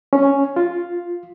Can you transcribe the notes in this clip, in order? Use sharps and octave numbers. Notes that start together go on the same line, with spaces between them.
C#4
F4